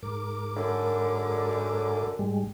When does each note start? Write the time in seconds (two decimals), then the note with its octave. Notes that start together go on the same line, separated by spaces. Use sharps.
0.03 G#2 A#4 D6
0.57 F#2 D3
2.19 G#2 G3 G#3